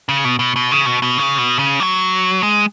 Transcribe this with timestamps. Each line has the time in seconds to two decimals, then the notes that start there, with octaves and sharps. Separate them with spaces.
0.09 C#3
0.25 B2
0.39 B2
0.56 B2
0.71 C#3
0.86 B2
1.02 B2
1.17 C#3
1.38 B2
1.59 C#3
1.80 F#3
2.43 G#3